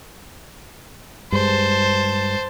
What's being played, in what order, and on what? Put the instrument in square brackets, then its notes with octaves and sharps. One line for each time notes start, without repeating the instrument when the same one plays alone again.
[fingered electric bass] G2 G#3 [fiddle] C5 A5